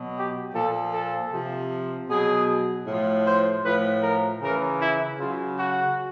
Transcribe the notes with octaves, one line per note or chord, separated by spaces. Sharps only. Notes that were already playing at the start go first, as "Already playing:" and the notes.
Already playing: B2 F#3
G4
A#2 F3 A4
A4
C3 F3
B2 F#3 G#4
A2 F3
C5
A2 F3 B4
A#4
C#3 E3 A#4
E4
C#3 F#3 F4
F#4